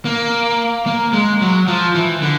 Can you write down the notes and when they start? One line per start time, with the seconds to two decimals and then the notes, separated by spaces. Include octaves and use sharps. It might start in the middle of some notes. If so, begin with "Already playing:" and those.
0.05 A#3
0.86 A#3
1.13 G#3
1.41 F#3
1.68 F3
1.95 E3
2.22 D3